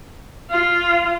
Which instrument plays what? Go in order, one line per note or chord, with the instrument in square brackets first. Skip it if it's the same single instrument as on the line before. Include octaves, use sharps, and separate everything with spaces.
[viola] F4